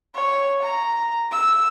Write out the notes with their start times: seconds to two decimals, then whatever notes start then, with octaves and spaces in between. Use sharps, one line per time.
0.15 C#5
0.62 A#5
1.31 E6